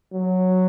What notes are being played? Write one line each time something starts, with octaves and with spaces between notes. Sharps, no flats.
F#3